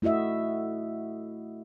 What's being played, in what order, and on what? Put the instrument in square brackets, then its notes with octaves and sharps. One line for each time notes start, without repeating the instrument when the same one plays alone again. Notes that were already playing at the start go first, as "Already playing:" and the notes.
[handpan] A3 E4 F#4 D#5 E5